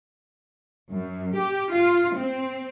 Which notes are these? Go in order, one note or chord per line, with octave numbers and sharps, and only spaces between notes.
F#2
G4
F4
C4